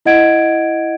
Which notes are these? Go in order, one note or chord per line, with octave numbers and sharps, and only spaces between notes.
E4 D#5 F#5 G#6 D7